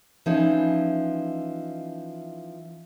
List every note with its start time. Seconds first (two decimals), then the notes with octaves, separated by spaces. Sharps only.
0.26 E3 F3 C#4 D#4